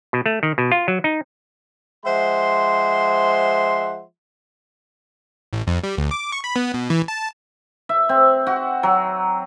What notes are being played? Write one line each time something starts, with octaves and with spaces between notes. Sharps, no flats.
B2
A3
D#3
B2
F4
F#3
D#4
F3 G#3 C5 E5 F#5 C6
A1
F2
G3
D2
D6
C#6
B5
B3
B2
E3
A5
E5
C4
F#4
F#3